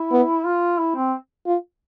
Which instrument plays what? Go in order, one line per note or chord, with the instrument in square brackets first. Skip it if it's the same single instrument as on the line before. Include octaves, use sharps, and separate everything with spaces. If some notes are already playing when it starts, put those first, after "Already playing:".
Already playing: [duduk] E4
[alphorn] B3
[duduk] F4
E4
C4
[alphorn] F4